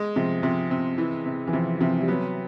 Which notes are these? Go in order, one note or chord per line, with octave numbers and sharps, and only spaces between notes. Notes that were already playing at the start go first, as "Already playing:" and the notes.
Already playing: G#3
C3 F3
C3 F3
C3
E3
C3
E3
C3 F3
C3 F3
G3
F#3 B3